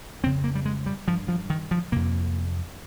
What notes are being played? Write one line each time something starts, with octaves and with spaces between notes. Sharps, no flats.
F2 C#3 C4
A#3
G3
G#3
G3
G2 F3
F3
D#3
F3
F2 C3 A#3